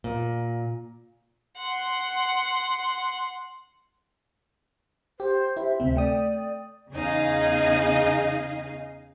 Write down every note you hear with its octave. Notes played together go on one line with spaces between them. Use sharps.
A#2
F#5 C6
G4 C5
E4 G4 C5 E5
D2 C3 C4
A3 D5 G5 D#6
E2 C#3 D#4 G#4 D#5 F5